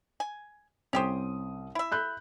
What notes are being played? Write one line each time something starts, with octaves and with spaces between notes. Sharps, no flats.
G#5
C2 C#4 G4 C5 D#6
E4 E5
B5 F#6 G6